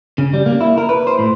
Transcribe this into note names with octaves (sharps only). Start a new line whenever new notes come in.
C#3
G3
A#3
E4
A#4
B4
C5
A2